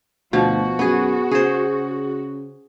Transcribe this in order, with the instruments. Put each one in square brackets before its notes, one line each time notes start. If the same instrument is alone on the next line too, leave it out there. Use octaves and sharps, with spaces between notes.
[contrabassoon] D2 [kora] B2 F3 [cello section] F#4
[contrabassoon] F#2 [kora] B3 G#4
[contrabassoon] C#3 [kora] G#4 C5